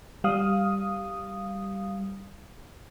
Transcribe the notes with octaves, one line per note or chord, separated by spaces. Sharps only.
G3 F5 D#6